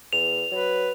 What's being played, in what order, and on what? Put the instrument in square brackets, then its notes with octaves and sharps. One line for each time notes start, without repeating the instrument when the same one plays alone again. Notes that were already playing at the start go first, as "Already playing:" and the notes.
[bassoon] E2 [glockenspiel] F7
[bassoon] F#3 [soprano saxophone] B4